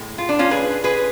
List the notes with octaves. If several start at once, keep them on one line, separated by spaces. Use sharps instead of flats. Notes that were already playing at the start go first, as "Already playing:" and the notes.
Already playing: A2 G#3
F4
D4
C#4 F4
G#4 B4
G#4 B4